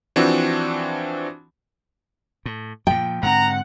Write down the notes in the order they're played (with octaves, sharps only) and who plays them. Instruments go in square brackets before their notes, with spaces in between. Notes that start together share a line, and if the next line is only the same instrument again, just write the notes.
[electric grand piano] E3 F3 C4 D4 F#4
[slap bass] A2
[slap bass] A#2 F3 [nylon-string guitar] G5
[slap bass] G#2 D3 C4 [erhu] F#5 [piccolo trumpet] A#5